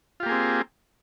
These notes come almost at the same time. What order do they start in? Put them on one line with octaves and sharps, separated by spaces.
F4 G4 A#3 G#4 C4